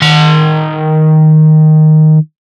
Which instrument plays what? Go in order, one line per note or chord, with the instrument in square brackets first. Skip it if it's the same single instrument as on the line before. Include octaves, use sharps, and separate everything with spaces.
[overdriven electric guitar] D#3 C6